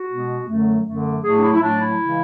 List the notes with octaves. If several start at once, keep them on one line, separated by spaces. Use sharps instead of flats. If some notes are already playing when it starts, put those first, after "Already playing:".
Already playing: F#4
B2 G#3 B3
F#2 D3 F#3 A3
F#2 D3 F#3 A3
A2 F#3 A3 G#4
D4
E4
E4
A2 F#3 A3 D4
E4
C#3 E3 G#3